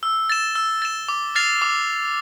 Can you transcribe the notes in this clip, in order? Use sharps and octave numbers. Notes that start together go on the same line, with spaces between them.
E6
A6 E7
E6
A6 E7
D6
F6 A6 C7 F7
D6